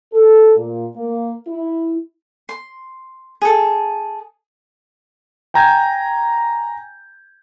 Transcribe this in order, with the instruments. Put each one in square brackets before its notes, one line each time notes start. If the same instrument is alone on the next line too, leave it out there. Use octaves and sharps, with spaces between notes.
[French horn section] A4
A#2
A#3
E4
[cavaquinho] C6
G#4 A4
[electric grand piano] G5 G#5 A#5 G6 G#6